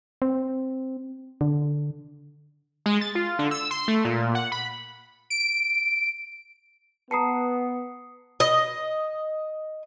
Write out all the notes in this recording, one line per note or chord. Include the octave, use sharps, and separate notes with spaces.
C4
D3
G#3
A6
F4
D3
E6
C6
A3
A#2
F#5
B5
D7
B3 A5 A#5 D#6 C7 C#7
D#5